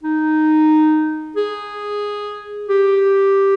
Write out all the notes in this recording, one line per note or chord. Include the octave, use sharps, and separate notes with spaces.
D#4
G#4
G4